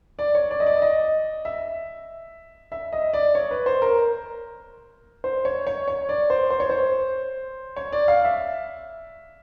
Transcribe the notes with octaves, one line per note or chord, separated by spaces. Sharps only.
D5
C#5
D5
D#5
D5
D#5
E5
E5
D#5
D5
C#5
B4
C5
A#4
C5
C#5
C#5
C#5
D5
C5
C5
C#5
C5
C#5
D5
F5
E5